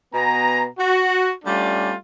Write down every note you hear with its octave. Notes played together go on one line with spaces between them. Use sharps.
B2 B3 G#5 A#5
F#4
G3 A3 C#4 D4 F4